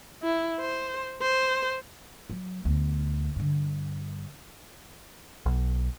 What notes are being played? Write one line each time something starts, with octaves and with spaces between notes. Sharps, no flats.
E4
C5
C5
F#3
D2 B3
G2 D3
B1